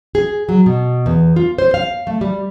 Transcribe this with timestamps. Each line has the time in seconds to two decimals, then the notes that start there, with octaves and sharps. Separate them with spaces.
0.15 G#4
0.49 F#3
0.66 B2
1.06 E2
1.36 F4
1.58 C5
1.74 F5
2.07 A3
2.21 G3